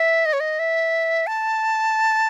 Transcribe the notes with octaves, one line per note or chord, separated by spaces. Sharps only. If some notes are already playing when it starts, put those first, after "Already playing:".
Already playing: E5
D#5
C#5
D#5
E5
A5